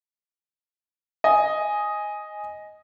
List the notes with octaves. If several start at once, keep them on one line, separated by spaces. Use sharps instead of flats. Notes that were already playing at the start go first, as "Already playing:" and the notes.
D#5 G#5